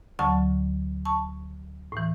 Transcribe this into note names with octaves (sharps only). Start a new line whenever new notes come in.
D2 D3 F#3 A5 C#6
A5 C#6
A2 E3